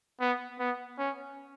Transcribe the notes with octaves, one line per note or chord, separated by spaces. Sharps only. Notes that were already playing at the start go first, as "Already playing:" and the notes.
B3
B3
C#4